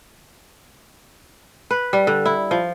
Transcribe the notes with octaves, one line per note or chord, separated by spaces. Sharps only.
B4
G3
D3
E4
F3